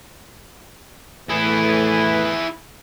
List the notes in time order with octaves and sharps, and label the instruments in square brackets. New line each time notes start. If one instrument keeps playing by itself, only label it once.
[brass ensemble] A2 E3 B4 [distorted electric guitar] E4 G#4